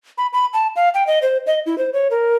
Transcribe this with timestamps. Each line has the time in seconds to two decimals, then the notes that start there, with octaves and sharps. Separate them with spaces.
0.18 B5
0.33 B5
0.53 A5
0.76 F5
0.94 G5
1.07 D#5
1.22 C5
1.47 D#5
1.66 E4
1.78 C5
1.93 C#5
2.11 A#4